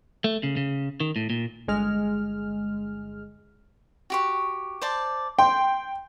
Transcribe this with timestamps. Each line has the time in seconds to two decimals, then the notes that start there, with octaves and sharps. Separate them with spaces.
0.24 A3
0.43 C#3
0.57 C#3
1.00 D#3
1.16 A2
1.30 A#2
1.68 G1 G#3 F6
4.10 F#4 G4 C#6
4.82 C5 D5 A5
5.39 G5 C6